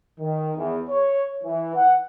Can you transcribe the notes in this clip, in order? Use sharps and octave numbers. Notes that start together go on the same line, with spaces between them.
D#3
E2
C#5
E3
F#5